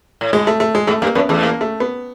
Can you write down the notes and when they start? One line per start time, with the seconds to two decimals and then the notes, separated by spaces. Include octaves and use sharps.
0.21 A2
0.33 G#2 G#3
0.47 A3
0.60 A3
0.75 G#3
0.87 G#2 A3
1.02 G2 A#3
1.15 F#2 B3
1.29 E2 A3
1.43 A#3
1.61 A3
1.80 B3